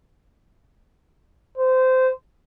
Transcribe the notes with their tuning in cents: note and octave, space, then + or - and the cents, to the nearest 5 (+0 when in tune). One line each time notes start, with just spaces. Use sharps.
C5 -20